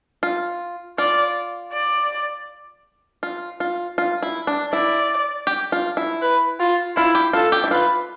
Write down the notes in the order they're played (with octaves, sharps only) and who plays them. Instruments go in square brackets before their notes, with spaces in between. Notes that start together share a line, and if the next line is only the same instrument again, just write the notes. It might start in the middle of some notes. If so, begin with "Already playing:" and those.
[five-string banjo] F4
[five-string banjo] F4 [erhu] D5
[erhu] D5
[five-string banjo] F4
F4
F4
E4
D4
[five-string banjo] E4 [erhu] D5
[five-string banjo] G4
F4
E4
[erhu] B4
F4
[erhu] E4 [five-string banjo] F4
[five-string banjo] G4
[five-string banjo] F4 [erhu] A4
[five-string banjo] G4
E4
[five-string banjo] F4 [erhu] B4